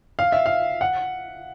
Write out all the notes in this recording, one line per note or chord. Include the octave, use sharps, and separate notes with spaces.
F5
E5
F5
F#5